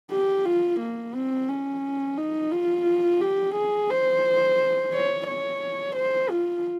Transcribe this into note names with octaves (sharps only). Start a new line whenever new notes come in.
G4
F4
A#3
C4
C#4
D#4
F4
G4
G#4
C5
C#5
C#5
C5
F4